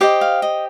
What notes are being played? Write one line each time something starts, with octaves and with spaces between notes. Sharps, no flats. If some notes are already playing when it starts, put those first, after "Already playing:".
G4 C5 D#5 D6
F5
D#5